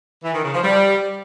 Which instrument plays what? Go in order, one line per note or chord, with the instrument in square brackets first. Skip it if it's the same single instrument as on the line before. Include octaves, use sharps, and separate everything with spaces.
[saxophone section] E3
D#3
C#3
F3
G3